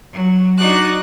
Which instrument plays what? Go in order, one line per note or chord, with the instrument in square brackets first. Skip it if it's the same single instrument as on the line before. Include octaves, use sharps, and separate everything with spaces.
[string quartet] F#3
D4 D#4 F#4 D5 F#6